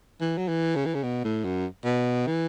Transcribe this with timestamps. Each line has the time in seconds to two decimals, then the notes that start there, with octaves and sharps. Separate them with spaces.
0.21 E3
0.38 F#3
0.48 E3
0.76 C#3
0.85 E3
0.95 C#3
1.03 B2
1.24 A2
1.44 F#2
1.85 B2
2.27 E3